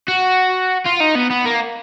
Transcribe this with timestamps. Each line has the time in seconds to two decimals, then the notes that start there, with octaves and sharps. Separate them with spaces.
0.08 F#4
0.85 F4
1.00 D#4
1.15 B3
1.31 B3
1.46 A#3